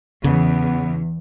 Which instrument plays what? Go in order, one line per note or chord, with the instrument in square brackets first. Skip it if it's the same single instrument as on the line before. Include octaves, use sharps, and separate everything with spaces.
[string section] E2 [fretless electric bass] C#3 [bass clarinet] B3